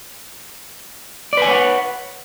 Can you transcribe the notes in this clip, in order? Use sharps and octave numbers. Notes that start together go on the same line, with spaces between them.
B4 C#5 D5 F#5 G#5